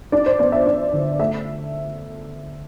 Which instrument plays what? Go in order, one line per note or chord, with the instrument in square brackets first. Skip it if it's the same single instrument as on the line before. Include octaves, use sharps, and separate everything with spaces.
[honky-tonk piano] D4 D5
C5
B3 D5
E5
D4 D5
D3
A3 E5